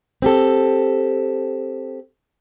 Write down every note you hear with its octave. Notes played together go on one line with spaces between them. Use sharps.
C4 G4 A4